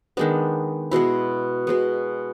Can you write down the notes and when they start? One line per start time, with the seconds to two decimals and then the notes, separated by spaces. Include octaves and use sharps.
0.17 D#3 G#3 B3 D4
0.91 B2 G#3 B3 E4
1.67 B2 G#3 B3